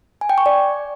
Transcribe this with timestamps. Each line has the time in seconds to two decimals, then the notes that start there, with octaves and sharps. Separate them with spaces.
0.21 G#5
0.30 G5
0.38 C#6
0.46 D5